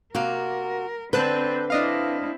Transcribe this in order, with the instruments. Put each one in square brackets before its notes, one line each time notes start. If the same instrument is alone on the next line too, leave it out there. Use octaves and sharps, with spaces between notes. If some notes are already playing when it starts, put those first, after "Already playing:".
[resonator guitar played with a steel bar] C3 A#3 F5 [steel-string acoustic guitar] F#4 [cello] A#4
[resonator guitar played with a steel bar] D3 [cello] C4 [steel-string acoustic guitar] B4 [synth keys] A5 F#6 G6
[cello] C4 E4 [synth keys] D4 D#5 F5